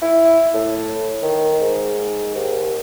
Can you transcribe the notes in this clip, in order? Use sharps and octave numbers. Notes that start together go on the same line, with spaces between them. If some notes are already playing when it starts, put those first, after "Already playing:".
E4
A2
D#3
G#2
D#2